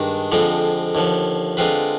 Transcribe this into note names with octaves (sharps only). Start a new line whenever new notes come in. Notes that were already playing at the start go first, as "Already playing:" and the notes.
Already playing: G2 D#3 G#3 D4
F2 D3 F3 G#3 C4
D#2 D3 F3
D3 G#3 C4 F4 B4